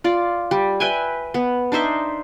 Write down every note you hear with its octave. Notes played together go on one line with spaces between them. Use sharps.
F4 D5
G3
B4 E5 G5 G#5
B3
D4 D#4 C5 E5